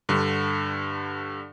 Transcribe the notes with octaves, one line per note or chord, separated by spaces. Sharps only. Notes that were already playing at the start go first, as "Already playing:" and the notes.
G2 D3